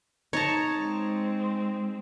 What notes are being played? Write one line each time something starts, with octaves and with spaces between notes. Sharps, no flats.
D#4 C#5 A5 A#5
G#3 C4